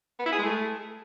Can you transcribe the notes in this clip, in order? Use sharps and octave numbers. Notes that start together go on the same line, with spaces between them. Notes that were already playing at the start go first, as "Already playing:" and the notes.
B3
E4
G#4
G#3
A3